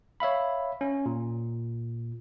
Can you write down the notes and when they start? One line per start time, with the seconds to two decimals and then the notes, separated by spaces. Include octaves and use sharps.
0.20 C#5 E5 F5 B5
0.81 C#4
1.06 A#2